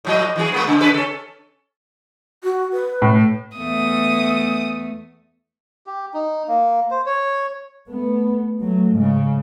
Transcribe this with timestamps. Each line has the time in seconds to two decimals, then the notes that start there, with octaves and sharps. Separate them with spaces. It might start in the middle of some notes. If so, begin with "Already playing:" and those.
0.05 A2 F3 D#5
0.36 E3 F3 G#4
0.52 G#3 A#3 B3
0.67 C#3
0.80 C#3 A4 B4
0.94 C#4 A4
2.44 F#4
2.73 B4
3.02 A2
3.58 E2 A3 D#6
5.87 G4
6.14 D#4
6.48 A#3
6.91 C5
7.06 C#5
7.89 A3 B3
8.62 F#3 A3
8.95 G#2 C#3